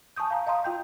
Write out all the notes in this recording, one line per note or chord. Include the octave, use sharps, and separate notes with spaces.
G#5 A5 C#6 D#6 G6
F5 A5 A#5
D#5 F5 A#5 C6 D#6
F4 G5 G6